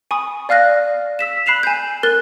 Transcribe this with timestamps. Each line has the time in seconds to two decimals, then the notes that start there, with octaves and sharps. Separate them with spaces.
0.11 G#5 B5 C#6 D#6
0.49 D5 F5 F6 F#6 A#6
1.19 E6 B6 E7
1.46 B5 F#6 C7 E7 F7
1.63 G#5 G6
2.03 A#4 F6 F#6 A6 G7